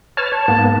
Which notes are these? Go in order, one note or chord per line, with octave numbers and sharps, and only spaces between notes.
B4 C#5 A5 F6
C#5 A5
G#2 A#3 B3